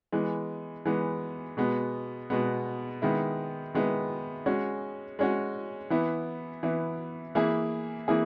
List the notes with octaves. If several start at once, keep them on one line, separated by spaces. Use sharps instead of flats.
E3 G#3 B3
E3 G#3 B3
B2 G#3 B3
B2 G#3 B3
D#3 G#3 B3 E4
D#3 G#3 B3 E4
G#3 C#4 F#4
G#3 C#4 F#4
E3 B3 E4
E3 B3 E4
E3 A#3 E4 G#4
E3 A#3 E4 G#4